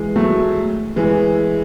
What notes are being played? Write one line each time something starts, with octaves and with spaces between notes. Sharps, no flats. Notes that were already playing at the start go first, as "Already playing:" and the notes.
Already playing: E3 G#3
F#3 A3
E3 G#3